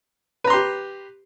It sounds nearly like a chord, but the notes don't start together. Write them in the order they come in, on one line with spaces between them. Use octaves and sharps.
B4 A#5 C6 G4